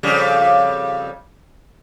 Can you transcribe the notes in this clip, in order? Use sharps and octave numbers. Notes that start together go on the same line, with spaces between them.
F2 C#3 G3